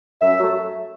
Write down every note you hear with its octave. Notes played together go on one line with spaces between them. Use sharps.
F#2 E5
F#3 A3